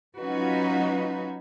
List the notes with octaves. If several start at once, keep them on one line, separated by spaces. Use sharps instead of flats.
F#3 C#4 D#4 F4 F#4 B4